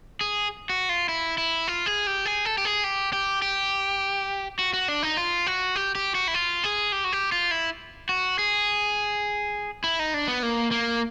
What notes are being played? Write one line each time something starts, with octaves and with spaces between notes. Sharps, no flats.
G#4
F#4
F4
E4
E4
F4
G#4
G4
G#4
A4
G4
G#4
G4
G4
G4
F#4
F#4
D4
D#4
F4
F#4
G4
G4
F#4
E4
F4
G#4
G4
F#4
G4
F4
E4
F#4
G#4
E4
D#4
D4
B3
A#3
A#3